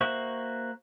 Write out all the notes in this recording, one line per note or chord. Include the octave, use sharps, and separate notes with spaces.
A#3 F#4 C5 E5 C#6